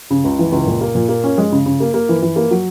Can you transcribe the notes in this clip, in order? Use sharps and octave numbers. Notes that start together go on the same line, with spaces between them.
C#3
C#2
E3
C#2
A#2
A#3
A#2
A#3
C#4
G#3
C#3
C#3
A#3
A#3
E3
E3
A#3
F#3